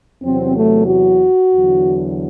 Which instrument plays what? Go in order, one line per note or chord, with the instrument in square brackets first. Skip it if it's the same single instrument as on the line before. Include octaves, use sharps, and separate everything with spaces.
[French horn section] E2 C3 F#3 C4
A3
F#4
E2 D3 F#3